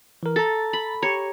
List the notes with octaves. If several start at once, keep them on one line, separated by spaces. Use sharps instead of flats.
E3 A#4
A4 A#5 A6
B5
G4 C#5 A#5